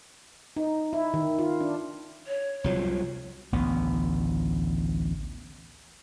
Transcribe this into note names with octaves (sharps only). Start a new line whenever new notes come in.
D#4
E4
D#3
F4
D4
C#5
C2 F3 F#3
A1 D2 B3